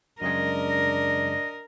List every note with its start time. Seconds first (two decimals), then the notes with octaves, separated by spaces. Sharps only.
0.22 F#2 C#3 G#3 D4 A#4 D#5